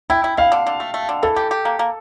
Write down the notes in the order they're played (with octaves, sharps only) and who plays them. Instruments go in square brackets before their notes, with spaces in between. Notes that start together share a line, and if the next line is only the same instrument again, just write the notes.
[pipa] E4 [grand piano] G5
[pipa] E4
[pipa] E4 [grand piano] F5
[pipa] D3
D3
A3
A3
D3
[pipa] E3 [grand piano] A4
[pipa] G4
G4
A#3
A#3